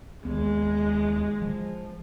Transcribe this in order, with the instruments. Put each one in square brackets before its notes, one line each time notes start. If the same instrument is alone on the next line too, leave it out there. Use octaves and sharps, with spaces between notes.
[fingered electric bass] D#2 B3 [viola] G#3
[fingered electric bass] F3